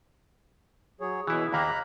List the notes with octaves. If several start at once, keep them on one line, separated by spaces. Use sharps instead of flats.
F#3 G#4 C#5
B2 E3 E4 G#4
D#2 A#3 A#5 B5 F#6